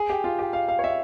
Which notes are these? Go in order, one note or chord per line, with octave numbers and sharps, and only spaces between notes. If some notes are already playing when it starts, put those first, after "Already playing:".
Already playing: G#4
G4
F4
G4
F5
F5
C#5
E5